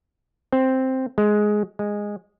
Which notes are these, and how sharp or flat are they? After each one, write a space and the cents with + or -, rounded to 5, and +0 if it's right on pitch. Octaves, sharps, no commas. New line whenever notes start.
C4 +0
G#3 +10
G#3 -10